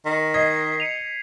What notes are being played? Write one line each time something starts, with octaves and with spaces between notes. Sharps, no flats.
D#3
D#5 G#6 B6 C7
C#7 D#7 F7